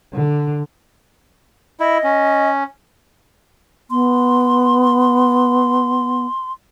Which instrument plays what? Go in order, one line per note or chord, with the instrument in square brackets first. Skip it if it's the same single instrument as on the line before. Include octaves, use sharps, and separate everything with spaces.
[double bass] D3
[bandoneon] E4 [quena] D#5
[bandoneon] C#4
[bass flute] B3 [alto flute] C6